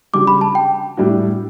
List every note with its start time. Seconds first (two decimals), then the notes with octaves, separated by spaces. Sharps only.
0.13 C#3 G3 D4 F#4 D6
0.27 B5
0.41 A5
0.55 G5
0.97 A2 G3 D4 F#4